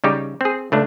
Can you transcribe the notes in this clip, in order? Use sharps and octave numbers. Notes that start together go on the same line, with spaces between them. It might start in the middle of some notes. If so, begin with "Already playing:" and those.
C#3 G3 D#4 G4
C4 G#4
C#2 A3 D4